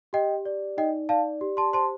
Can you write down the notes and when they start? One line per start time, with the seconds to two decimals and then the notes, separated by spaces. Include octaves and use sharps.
0.13 G4 D#5 G5
0.46 D5
0.77 D#4 D#5 G5
1.09 D5 F5 A5
1.41 G4
1.57 A5 C6
1.73 C5 A5 C6